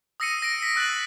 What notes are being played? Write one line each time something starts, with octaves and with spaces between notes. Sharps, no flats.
D#6 E6 A#6 C7 C#7 D#7
A#6 D7 D#7
B6
E6 F#6 A6 A#6 F#7